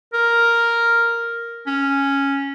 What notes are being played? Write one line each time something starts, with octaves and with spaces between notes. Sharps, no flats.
A#4
C#4